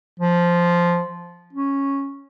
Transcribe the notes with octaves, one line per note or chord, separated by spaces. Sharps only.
F3
C#4